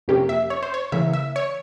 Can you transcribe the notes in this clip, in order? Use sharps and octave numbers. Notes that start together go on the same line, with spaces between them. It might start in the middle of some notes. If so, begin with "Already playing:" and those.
F2 C3 F3 A#3 C#4 G4
E5
C#5
C5
C#5
C#3 E3 A#3 E5
E5
C#5